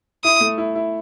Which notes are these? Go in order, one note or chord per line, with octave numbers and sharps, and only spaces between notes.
E4 D#6
A3
E4
E4